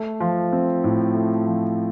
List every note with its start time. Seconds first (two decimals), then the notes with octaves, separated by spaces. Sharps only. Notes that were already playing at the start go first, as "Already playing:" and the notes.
Already playing: A3
0.20 F3
0.53 C4
0.84 A2
1.14 A3
1.47 F3